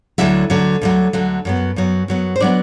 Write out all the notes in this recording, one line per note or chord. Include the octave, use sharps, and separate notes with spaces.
D2 D3 F#3 E4 E5
D2 D3 F#3
D2 D3 F#3
D2 D3 F#3
F#2 F#3 B3
F#2 F#3 B3
F#2 F#3 B3
C5
F#3 B3 D4 D5